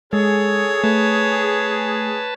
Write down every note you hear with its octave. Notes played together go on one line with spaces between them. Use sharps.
G#3 G#4 A4 C#5
A3 B4 A5